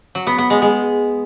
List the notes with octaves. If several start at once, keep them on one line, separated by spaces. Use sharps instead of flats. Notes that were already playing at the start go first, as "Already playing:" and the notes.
F#3
B3
B3
G#3
G#3